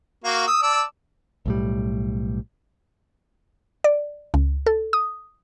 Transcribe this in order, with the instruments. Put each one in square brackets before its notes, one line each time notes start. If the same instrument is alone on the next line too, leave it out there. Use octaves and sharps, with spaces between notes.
[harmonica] A#3 F#4 F5
D#6 E6
D5 A5 E6
[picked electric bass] B1 A2 G3
[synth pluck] D5
C#2
A4
D#6